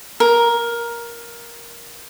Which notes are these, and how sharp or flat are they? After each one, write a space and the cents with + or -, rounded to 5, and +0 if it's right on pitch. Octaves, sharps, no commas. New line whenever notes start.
A#4 +10